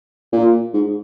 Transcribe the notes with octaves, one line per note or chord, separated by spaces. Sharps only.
A#2
G#2